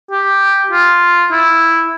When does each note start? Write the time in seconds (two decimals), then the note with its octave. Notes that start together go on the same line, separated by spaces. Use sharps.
0.11 G4
0.71 F4
1.31 E4